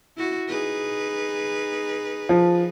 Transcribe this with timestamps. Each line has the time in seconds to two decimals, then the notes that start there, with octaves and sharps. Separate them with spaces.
0.17 E4 F#4
0.48 D#4 G#4 B4
2.29 F3